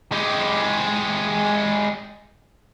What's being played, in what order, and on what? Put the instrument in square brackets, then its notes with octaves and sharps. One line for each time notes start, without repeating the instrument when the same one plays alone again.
[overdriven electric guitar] G#3 G4